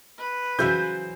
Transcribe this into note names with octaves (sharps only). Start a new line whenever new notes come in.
B4
C#3 E3 F#3 F#4 C5 E5 G6